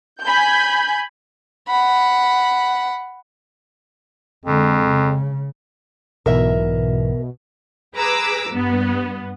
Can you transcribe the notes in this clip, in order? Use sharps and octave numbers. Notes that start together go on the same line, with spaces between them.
G#5 B5 G6
F#5 B5
F2 D3 G#3
C#3
B1 G#2 B2 E3 A#4 E5
G#4 B4 A#5 D6 E6
G2 B3